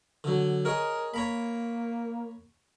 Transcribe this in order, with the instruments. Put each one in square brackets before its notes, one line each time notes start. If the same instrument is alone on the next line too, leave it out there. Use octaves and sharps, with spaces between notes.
[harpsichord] D3 F#3
[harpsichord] G#4 C#5 D#5 [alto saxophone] A#4
[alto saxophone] A#3 [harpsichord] C#5 A#5 B5